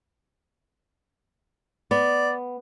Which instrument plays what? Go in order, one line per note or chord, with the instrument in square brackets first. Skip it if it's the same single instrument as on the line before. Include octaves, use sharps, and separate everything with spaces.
[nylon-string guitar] B3 [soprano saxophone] D5